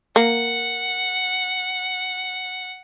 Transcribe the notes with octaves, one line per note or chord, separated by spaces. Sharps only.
A#3 F#5